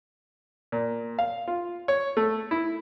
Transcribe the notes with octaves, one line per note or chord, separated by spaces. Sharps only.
A#2
F5
F4
C#5
A3
E4